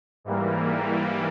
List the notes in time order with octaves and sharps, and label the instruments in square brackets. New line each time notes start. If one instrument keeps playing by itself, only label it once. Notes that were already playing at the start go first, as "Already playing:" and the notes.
[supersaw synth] G#2 E3 G3 A#3